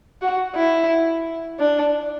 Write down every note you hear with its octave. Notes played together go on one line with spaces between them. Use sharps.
F#4
E4
D4